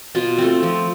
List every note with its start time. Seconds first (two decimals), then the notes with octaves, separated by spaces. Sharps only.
0.15 B2 F4
0.38 A3 C4
0.63 F3